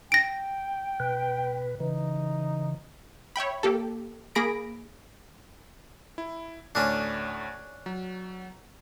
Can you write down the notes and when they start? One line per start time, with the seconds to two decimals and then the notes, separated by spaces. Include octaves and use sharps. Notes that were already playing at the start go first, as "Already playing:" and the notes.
0.12 G5 A#6 D7
1.00 B2 B4
1.80 C#3 E3 D#4
3.36 C#5 E5 G5 B5
3.63 A#3 G4 A4
4.35 A#3 G#4 B5 A#6 D7
6.18 E4
6.75 D2 A2 C#4 D4
7.86 F#3